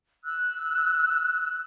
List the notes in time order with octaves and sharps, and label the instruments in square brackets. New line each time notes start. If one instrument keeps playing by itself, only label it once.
[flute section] E6 F#6